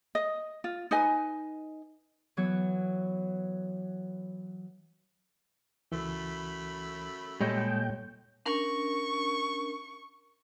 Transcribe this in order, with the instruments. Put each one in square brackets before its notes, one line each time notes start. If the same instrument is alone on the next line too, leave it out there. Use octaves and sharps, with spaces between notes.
[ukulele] D#5
F4
D#4 B4 D#5 G#5
[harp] E3 F#3 B3 C#5
[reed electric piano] C#2 E3 [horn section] F#2 A3 B5
[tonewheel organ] A#2 G5 [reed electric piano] G3 C#5 G6 [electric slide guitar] G#3 A4 D#5
[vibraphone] C#4 D4 A#4 [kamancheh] C#6